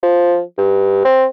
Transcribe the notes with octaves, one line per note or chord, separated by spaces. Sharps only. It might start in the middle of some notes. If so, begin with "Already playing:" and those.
F3
G2
C4